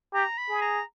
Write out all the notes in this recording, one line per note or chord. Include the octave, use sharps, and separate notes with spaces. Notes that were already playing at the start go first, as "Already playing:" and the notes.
G4 A#5
B5
G#4
A#5